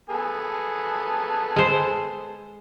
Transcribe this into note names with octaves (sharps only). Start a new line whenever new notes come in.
B3 G#4 A4
G#3 C5